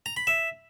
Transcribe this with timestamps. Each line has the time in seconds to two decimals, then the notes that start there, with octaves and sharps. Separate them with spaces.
0.06 A#5
0.17 B5
0.27 E5